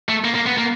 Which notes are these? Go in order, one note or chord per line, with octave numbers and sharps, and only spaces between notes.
A3
A#3
A#3
B3
A#3